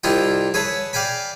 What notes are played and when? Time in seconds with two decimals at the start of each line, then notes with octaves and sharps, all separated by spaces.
0.03 C2 D4 E4 F4 D#5 G5
0.54 G#4 B4 C#5 E5 A5
0.93 D5 F5 G5 G#5 B5